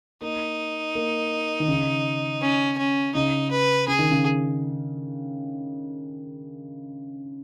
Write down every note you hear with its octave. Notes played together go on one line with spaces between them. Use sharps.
A#3 D#4
A#3
D#3
C#3
C#4
C#4
C#3 D#4
B4
C#3 G#4
D#3
C#3